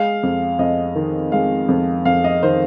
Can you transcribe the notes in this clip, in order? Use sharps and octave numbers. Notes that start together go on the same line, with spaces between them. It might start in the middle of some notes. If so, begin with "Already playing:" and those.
Already playing: G#3 F5
F2
F2 D#5
D#3
G#3 F5
F2
F2 F5
D#5
D#3 C5